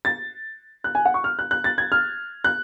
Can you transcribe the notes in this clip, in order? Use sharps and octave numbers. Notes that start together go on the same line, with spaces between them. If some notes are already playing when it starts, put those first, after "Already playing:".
A6
F#6
G#5
F#5
C#6
F6
F#6
F#6
A6
G#6
F6
F#6